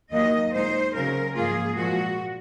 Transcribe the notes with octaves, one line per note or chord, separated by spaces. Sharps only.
D#2 D#3 F#3 A#3 D#5
A#2 G#3 D#4 C5
C#3 F#3 C#4 A#4
G#2 F3 A#3 F4 G#4
A#2 F3 G#3 F#4